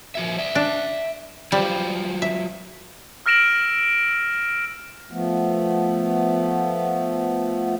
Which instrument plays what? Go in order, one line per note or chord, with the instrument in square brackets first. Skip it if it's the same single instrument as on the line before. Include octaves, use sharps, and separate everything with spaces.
[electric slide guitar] F3 F#4 E5
D5 E5
[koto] D4
[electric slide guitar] F#3 F4 C5 [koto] G3
[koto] E5
[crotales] E6 F6 A#6 D7 E7 F#7
[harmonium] F3 A3 B3